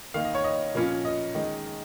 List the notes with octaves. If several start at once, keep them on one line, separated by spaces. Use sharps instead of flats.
D#3 A#3 D#4 F5
D#5
C#5
D#5
A#2 F3 A#3 C#4 F4
D#5
D#3 G#3 D#4